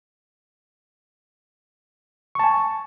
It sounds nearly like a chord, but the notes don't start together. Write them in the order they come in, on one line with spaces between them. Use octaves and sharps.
C#6 A5 G#5